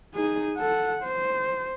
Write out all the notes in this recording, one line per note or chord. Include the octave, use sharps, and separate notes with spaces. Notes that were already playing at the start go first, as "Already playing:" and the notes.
D#4 G#4
A4 F#5
C5